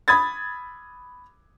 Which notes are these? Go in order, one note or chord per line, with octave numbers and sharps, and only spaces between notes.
B5 D#6 G#6 A6